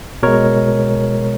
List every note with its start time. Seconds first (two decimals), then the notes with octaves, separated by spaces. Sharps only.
0.23 B2 G#3 A#4 C#5